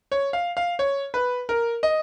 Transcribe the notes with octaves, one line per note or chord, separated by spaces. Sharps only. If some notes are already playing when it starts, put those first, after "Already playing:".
C#5
F5
F5
C#5
B4
A#4
D#5